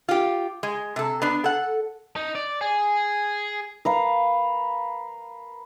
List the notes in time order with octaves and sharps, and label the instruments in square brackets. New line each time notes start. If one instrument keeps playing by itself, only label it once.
[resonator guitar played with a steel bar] F4 G4
G#3
C3 A4
B3 D4
A4 F#5
[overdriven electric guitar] D#4
D5
G#4
[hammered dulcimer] A#4 B4 F5